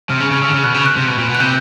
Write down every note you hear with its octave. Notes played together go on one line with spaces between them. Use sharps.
C3 F6
C#3
C#3 F6
C#3 E6
D3
C#3 F6
B2 F#6
C#3 G6
F#6
C3
B2
A#2
B2
F#6
C3 G6